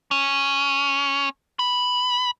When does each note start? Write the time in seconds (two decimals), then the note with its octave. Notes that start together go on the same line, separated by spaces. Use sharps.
0.11 C#4
1.59 B5